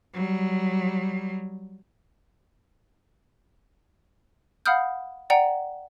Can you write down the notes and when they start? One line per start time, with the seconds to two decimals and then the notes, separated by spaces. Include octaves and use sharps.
0.14 F#3 G3
4.66 F5 F#5 B5 D#6 F6 G6
5.30 D5 F#5 G5 A#5